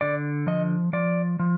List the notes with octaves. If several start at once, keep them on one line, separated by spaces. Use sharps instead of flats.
D3 D5
F3 D#5
F3 D5
F3